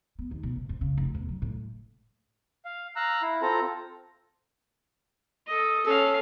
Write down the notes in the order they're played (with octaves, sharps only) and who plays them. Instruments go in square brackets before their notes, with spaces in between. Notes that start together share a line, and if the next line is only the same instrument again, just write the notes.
[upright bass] B3
D#2
B2
F#1
F2
C#3
F1
E2
F#3
A2
[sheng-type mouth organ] F5
F5 A#5 E6 F#6
E4
C4 F4 A4 A#5
[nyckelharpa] A4 D#5
[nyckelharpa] C#4 F5 [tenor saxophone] A4